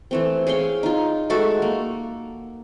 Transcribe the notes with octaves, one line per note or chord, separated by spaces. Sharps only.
E3 A3 C4
G#4 C#5 F5 G5
D#4 F4
G#3 A3 F#4 A4
A#3